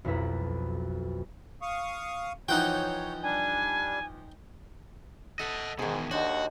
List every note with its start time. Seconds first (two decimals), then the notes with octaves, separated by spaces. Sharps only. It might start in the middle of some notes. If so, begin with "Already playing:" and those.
0.04 B1 F2 B2 E4 B4 A#5
1.62 F5 C#6 D#6
2.49 E3 F3 D#4 C#5 F#5 G5
3.22 G3 D4 G#5
5.39 A4 D#5 E5 F#5
5.79 E2 G#2 B2 D#3 G#4
6.11 D#2 D4 F#4 C5 C#5 D#5 F#5